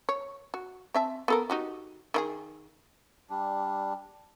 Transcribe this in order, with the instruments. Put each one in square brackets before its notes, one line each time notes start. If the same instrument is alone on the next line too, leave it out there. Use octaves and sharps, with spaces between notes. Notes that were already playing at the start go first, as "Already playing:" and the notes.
[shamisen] C#5
F#4
C4 E5 A5
B3 A4 A#4
D#4 F#4 G4
D#3 E4 G#4
[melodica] G3 D4